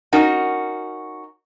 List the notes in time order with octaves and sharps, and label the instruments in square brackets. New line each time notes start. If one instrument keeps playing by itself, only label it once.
[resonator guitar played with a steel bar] C#4 D#4 F#4 A#4